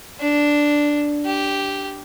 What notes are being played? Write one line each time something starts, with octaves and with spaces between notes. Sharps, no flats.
D4
G4